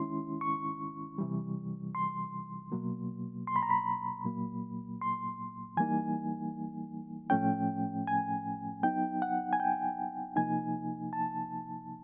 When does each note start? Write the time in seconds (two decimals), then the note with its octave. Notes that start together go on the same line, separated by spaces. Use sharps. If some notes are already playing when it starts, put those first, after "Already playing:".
Already playing: D#3 G#3 C#4 E4 C6
0.41 C#6
1.18 C3 E3 G3
1.95 C6
2.72 B2 F#3 A#3
3.47 C6
3.56 B5
3.63 A#5
3.70 B5
4.25 A#2 F#3 A#3
5.01 C6
5.77 E3 G3 A#3 D#4 G#5
7.30 A2 F3 A3 C#4 G5
8.07 G#5
8.83 F#3 B3 D#4 G5
9.22 F#5
9.53 G#5
9.60 G5
10.36 C3 F3 A#3 D#4 G#5
11.13 A5